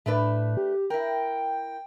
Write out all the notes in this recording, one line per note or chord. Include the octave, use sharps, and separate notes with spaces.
A2 A3 D4 B4
G4
E4 A#4 G5